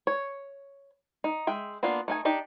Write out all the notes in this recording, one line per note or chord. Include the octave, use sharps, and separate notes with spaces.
C#5
D#4
G#3 E5 G5
A#3 B3 D4 F4
A3 D#4 G#5
D4 D#4 G4